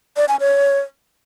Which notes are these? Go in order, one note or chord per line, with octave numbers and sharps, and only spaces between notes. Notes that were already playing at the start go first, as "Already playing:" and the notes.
D5
G#5
C#5